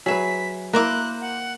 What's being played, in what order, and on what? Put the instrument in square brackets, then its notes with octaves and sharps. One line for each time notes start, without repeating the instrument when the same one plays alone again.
[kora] F#3 B4 [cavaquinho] G#4 E5 [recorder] B6
[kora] A#3 E4 [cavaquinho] A#4 C5 D6 [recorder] F#6
[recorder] F#5